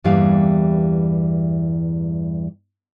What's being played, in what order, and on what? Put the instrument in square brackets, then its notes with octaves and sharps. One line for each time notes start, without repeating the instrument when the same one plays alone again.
[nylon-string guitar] E2 G2 E3 G3 A#3 F5